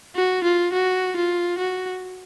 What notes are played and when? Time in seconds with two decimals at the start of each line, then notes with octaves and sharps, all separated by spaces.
0.16 F#4
0.44 F4
0.73 F#4
1.16 F4
1.58 F#4